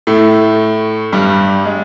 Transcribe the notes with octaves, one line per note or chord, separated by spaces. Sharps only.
A2 A3
G2 G3
G#3